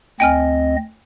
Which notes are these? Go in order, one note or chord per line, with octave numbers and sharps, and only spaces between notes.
D2 C4 D#5 G5 G#5 F6